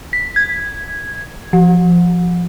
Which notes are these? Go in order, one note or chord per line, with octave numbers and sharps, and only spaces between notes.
B6
G#6
F3